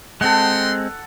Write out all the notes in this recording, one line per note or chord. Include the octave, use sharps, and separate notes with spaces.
G#3 C4 A4 D#5 F#5 G5 C6